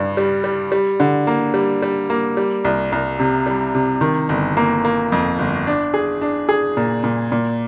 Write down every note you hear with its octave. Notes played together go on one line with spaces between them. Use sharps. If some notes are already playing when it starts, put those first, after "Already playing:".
Already playing: G2 G3
G3
G3
G3
D3
A#3
G3
G3
A#3
G3
C2
C2
C3
G3
C3
D#3
G1
A#3
A#3
F2
G1
D4
G#4
D4
G#4
A#2
A#2
A#2